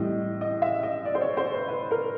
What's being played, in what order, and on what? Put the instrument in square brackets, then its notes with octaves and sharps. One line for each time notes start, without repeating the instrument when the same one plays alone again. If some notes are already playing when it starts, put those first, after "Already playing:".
Already playing: [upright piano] A2 E3 G3 C4 D#5
D#5
E5
D#5
D5
C5
C#5
C5
B4
B4
A#4